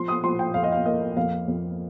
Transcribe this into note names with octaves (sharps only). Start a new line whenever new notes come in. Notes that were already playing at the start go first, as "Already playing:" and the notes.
Already playing: F3 C6
D#6
F3 C6
G5
F2 F5
D#5
F5
A#3 D#5
F2 F5
F2